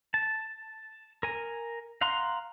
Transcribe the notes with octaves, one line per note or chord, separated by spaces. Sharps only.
A5
A#4 G#5
F5 F#5 A#5 C6